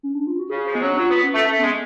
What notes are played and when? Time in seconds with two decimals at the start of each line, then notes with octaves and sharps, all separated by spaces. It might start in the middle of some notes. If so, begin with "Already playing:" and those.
0.03 C#4
0.15 D4
0.27 F4
0.39 F#4
0.50 C#3 G#4
0.66 F3
0.74 G#3 B3
0.82 F#3 C#4
0.90 D4
0.98 F#3 F4
1.10 B3
1.23 C#4
1.34 A3
1.46 A3 C#4
1.59 G#3 B3